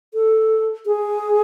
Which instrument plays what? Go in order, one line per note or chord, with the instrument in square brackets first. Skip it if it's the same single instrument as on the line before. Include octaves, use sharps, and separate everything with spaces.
[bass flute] A4
G#4